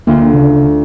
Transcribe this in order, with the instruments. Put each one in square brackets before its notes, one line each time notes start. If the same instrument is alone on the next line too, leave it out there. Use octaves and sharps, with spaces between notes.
[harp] D2 F4 [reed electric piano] A#3
[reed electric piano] C#3